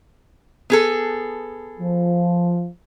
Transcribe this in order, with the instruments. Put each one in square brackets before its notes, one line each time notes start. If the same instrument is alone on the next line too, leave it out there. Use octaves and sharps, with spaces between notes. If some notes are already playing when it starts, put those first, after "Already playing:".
[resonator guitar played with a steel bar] B3 G#4 A4
[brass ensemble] F3